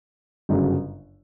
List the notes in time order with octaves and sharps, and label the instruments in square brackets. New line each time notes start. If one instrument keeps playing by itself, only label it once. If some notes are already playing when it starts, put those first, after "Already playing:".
[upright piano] G1 F#2 C#3 F#3